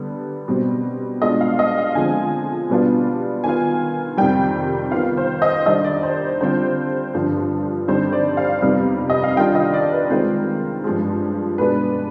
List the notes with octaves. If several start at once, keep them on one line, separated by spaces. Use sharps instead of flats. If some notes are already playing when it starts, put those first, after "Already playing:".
Already playing: D3 G3 B3
B2 G3 C4
B2 G#3 D4 F4 D#5
F5
D#5
F5
D3 F3 G#3 C4 G#5
B2 G3 B3 D4 F4
D#3 B3 F4 G#5
F2 C3 D#3 G3 G5
D#3 B3 F4 F5
C5
D#5
D#3 G3 D4 D#5
D5
C5
D3 G3 C4 F4 C5
G2 D3 F3
D3 G3 C4 D#4 C5
D5
F5
F2 C3 G3 B3 D#4
D#5
F5
D#3 G3 D4 F4 G5
D#5
D5
B4
D#3 G#3 C4 F4
G2 F3 G#3
B2 G#3 B3 D4 B4